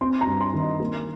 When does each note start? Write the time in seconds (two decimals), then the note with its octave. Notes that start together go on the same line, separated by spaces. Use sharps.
0.01 C4 C6
0.21 A#5
0.27 G2
0.41 C6
0.54 D#3
0.60 D#5
0.80 A#3